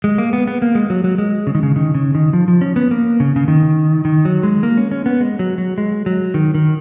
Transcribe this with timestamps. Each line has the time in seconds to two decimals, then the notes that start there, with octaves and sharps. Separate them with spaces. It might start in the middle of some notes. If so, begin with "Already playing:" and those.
0.04 G#3
0.18 A#3
0.33 B3
0.47 B3
0.62 A#3
0.75 G#3
0.90 F#3
1.04 F#3
1.18 G#3
1.47 C#3
1.55 D#3
1.63 C#3
1.76 D#3
1.95 C#3
2.15 D#3
2.33 F3
2.48 F3
2.61 C#4
2.76 B3
2.91 A#3
3.20 C#3
3.36 C#3
3.48 D#3
4.05 D#3
4.25 F#3
4.43 G#3
4.63 A#3
4.77 C#4
4.91 C#4
5.06 B3
5.21 G#3
5.39 F#3
5.58 F#3
5.78 G#3
6.06 F#3
6.34 D#3
6.55 D#3